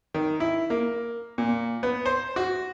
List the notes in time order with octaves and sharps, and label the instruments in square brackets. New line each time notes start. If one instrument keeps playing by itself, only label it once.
[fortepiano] D#3
E4
A#3
A#2
B3
C5
F#4